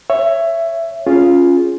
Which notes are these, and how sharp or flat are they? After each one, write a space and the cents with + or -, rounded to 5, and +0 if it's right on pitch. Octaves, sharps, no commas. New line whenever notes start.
C#5 +0 E5 +15
C#4 +0 F4 +0 G#4 +0